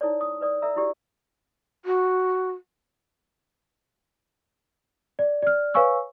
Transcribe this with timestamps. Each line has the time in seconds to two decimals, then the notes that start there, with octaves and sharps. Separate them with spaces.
0.01 D#4 E4 A4 C#5 D5
0.21 D#6
0.41 B4 D5 D#6
0.62 A4 D5 E5 A#5 E6
0.76 E4 F#4 G4 D5
1.85 F#4
5.19 D5
5.42 D5 F6
5.74 B4 C#5 F5 G#5 C#6 E6